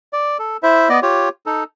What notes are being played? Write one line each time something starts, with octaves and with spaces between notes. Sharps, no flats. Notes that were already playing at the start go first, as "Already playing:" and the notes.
D5
A4
E4 C5 E5
B3 D5 D#5
F4 G4 C#5
D#4 A4